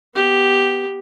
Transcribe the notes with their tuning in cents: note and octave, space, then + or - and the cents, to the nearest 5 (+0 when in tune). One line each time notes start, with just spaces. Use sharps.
B3 +0 G4 +0